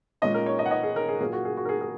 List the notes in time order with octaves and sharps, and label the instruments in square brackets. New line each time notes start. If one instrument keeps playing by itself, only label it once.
[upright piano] A#2 G#3 C#4 D#5
A#4
C#5
D#5
F#5
D#5
G#4
A#4
G#4
A#2 F#3 A#3 G#4
F#4
G#4
F#4
A#4
G#4
G#4